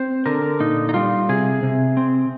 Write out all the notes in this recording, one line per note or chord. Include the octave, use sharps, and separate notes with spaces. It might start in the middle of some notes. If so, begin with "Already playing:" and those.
Already playing: C4 C5
D3 A#4
A#2 D#4
D#4
G3 F4
C3 G#4
C3
C4